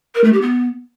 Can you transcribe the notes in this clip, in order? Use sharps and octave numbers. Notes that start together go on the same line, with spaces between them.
A#4
A3
G4
B3